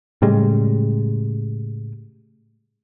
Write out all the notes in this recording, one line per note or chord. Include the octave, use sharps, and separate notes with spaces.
A2 C#3 G3 G#3